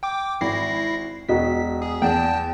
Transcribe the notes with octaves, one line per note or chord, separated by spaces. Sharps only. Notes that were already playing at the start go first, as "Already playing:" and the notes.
G5 D6
G#1 E4 A#6 C7
E1 F#4 D#5 B6
G#4
E2 G5 A5